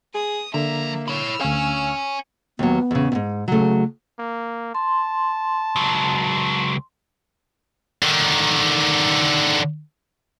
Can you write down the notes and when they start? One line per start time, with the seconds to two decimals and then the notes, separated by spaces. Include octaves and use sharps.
0.15 G#4 D#6
0.54 D3 F3 A#3 E5 A#5
1.08 E4 C#5 E6 F6
1.40 D2 C#4 C#5 F5 G#5
2.59 D#2 F#3 B3
2.91 E2 C#3
3.12 E2 G#2
3.48 C#3 F#3 A3
4.19 A#3
4.75 A5 C6
5.76 C#2 F#3
8.02 D3 D#3